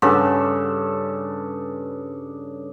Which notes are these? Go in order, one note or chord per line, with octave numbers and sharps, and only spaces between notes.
G2 C#3 A4